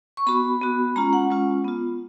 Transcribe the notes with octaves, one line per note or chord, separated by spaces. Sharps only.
C#6
B3 F#4 B5
B3 F#4
G#3 C#4 F4 A#5
F#5
G#3 C#4 F4
B3 F4